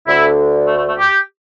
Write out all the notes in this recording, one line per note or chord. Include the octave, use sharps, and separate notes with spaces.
D2 D3 E4
A3
A3
A3
G4